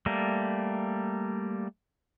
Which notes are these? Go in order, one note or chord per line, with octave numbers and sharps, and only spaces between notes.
G3 A3 A#3